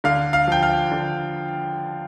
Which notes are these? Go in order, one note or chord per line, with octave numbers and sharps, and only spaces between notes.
D3 F5
F5
F3 G5
F5
D3